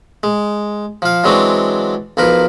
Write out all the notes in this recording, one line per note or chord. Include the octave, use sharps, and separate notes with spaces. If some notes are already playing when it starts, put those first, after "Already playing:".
G#3
F3 F5
E3 F#3 G#3 C4 D4 F#4
B1 F3 A#4 B4